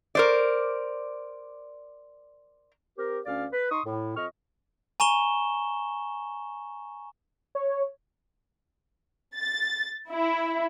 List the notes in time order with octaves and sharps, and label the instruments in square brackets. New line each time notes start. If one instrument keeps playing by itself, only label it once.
[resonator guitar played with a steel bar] A#4 C5 D5
[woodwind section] C4 G4 A#4
D2 C#4 D5 F5
B4
D#4 C6 C#6 D#6
A2
F2 D#5 C#6 F6
[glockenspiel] G#5 A#5 C#6 E7 G7
[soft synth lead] C#5
[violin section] A6
E4